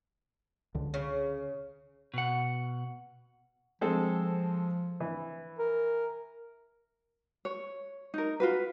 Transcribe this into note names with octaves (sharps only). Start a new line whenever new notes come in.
C#2 D3
C#3
B2 F#5
F3 G#3 C4 A4
E3
A#4
C#5
D#4 A#4
F4 F#4 B4